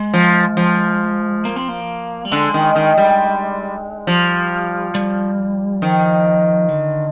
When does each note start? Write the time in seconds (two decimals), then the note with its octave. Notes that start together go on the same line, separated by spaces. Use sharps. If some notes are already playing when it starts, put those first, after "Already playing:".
Already playing: G#3
0.14 F3
0.57 F3
1.45 A#3
1.56 C4
1.68 A#3
2.25 G3
2.32 D3 G#3
2.54 D#3
2.76 D#3
2.97 G3
4.07 F3 G3
4.95 G3
5.82 D#3 F3
6.69 D3